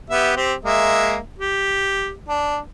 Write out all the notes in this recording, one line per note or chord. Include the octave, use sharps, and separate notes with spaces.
B3 G4 E5
C4 G4
G#3 A#3 E5
G4
D4